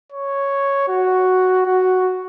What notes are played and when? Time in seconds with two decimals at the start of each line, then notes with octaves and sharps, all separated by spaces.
0.12 C#5
0.88 F#4
1.65 F#4